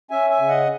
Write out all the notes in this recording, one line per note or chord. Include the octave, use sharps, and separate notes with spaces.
C#4 E5 G#5
E5 G#5
C#3
D#5 F#5